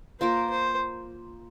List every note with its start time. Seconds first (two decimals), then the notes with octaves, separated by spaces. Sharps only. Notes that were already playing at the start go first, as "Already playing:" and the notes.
0.20 A#3 F4 A#4 C5
0.50 C5